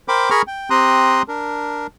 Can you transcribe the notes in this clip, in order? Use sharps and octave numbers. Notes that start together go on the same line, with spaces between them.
A#4 C5 G5 B5 D6
G#4 A#4 A#5 B5 C#6 F6
G5
C4 G4 A#5 C6 D#6 F#6
D4 A#4